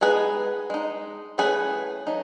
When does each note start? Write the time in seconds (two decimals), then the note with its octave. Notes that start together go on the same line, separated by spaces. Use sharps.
0.01 G#3 B3 D#4 G#4 B4
0.70 G#3 D#4
1.38 E3 A3 C#4 G#4 B4
2.07 F#3 A3 D#4